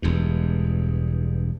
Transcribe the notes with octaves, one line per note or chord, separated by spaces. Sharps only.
E1 E2 G2